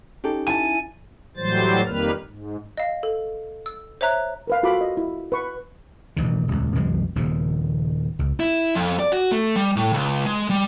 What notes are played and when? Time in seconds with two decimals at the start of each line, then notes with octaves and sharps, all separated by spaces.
0.24 C#4 D#4 G4 A4
0.48 E4 G#5 A5
1.37 A2 E3 F#3 G3 C5 A6
1.86 F2 D#3 G3 A#3 B4 F6
2.27 G#2
2.77 D#5 F5
3.03 A4
3.66 E6
4.01 C5 C#5 E5 A#5 F#6
4.47 A#4 B4 F5
4.63 F4 F#4 A4 F5 B5 D6
4.81 D#5
4.97 E4
5.32 B4 C#6
6.17 E1 A1 G2 D#3
6.48 D#1 C#2
6.75 C2 F#2 E3 G#3
7.15 D#1 D#2 C#3 F3
8.19 C#2
8.40 E4
8.75 F2
8.99 D5
9.12 F#4
9.32 A3
9.56 G3
9.76 A2
9.93 C#2
10.25 G#3
10.50 G3